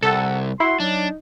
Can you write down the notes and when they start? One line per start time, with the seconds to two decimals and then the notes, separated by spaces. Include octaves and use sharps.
0.03 C2 A4 F#5
0.60 E4 F#4 C6
0.80 F#3 D4 D#4